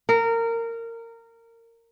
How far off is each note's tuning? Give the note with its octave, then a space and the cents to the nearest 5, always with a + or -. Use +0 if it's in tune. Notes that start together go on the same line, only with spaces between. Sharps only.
A#4 -20